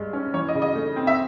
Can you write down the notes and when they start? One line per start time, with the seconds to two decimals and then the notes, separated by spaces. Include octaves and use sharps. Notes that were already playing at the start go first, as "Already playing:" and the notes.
Already playing: G2 G#3
0.13 C#4
0.34 E3 C#5
0.48 D#5
0.55 C#3
0.62 D#5
0.75 A3
0.96 C4
1.07 E5